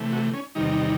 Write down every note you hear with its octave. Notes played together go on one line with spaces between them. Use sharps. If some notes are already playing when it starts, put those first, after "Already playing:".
Already playing: C3 E3 A3
F#4
C#4
E2 C3 D#3 G3 D#4